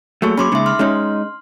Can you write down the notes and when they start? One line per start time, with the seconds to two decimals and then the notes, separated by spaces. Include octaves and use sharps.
0.22 F#3 A3 A#3 G#4 C#6
0.38 F#3 C#4 B5 C6 D6
0.52 C#3 G#3 D#4 E5
0.66 C6 F6
0.79 G#3 C#4 D#4